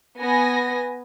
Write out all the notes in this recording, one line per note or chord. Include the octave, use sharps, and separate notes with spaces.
B3 G#5 A#6